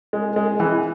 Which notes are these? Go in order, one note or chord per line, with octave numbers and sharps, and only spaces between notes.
G#3
G#3
E3